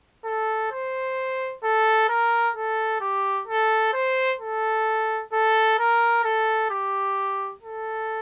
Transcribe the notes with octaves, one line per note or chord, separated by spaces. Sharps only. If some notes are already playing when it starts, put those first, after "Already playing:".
A4
C5
A4
A#4
A4
G4
A4
C5
A4
A4
A#4
A4
G4
A4